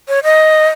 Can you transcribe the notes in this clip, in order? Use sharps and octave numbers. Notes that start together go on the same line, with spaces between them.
C#5
D#5